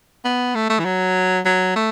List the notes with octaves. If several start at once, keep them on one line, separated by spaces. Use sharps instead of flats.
B3
A3
A3
E3
F#3
F#3
A3